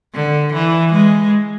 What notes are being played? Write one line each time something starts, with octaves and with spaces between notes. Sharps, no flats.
D3
E3
G#3